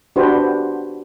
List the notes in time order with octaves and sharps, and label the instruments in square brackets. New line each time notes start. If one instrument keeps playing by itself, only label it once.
[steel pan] D4 F#4 G4 B4 C5